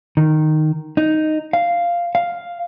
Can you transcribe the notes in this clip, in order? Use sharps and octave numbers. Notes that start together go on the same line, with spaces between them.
D#3
D#4
F5
F5